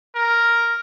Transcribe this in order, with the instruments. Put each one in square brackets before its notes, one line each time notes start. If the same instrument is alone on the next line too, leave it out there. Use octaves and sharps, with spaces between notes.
[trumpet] A#4